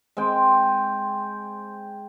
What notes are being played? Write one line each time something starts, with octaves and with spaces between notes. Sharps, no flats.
G#3 C4 G5